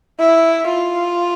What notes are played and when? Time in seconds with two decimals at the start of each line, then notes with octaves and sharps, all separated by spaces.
0.20 E4
0.69 F4